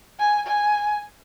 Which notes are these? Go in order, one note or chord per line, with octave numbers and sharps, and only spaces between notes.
G#5
G#5